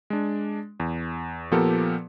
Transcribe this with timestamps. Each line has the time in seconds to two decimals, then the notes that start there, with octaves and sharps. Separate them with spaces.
0.10 G#3 D4
0.80 E2
1.51 A#2 F3 B3 G4 A4 A#4